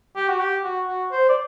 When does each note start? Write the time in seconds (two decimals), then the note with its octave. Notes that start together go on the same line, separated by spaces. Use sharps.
0.16 G4
0.28 F#4
0.40 G4
0.64 F#4
0.88 F#4
1.12 C5
1.29 D5